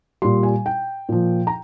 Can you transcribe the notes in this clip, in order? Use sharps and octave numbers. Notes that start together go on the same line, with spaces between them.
A#2 G3 C6
G#5
G5
A#2 F3
A#5